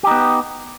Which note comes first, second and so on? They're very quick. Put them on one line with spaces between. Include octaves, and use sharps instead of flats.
G4 D#4 B3